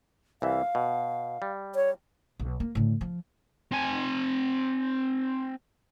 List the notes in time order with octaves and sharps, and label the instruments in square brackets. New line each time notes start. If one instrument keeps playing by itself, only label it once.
[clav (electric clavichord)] C2 E3 E5 [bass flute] F5
[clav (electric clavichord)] B2
G3
[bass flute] C#5
[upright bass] B1
A#3
A2 D3
F3
[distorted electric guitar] C4 G#5